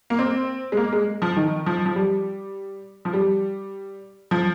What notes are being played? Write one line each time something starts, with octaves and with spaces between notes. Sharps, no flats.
A#3
C4
G#3
A#3
G#3
F3
D#3
F3
F3
G3
F3
G3
F3